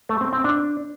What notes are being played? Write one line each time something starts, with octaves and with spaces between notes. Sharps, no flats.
A3
C4
C4
D4